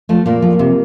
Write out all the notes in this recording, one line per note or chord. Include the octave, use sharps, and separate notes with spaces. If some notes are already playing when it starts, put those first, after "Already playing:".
F3 A3
A#2 A#3
F3
C3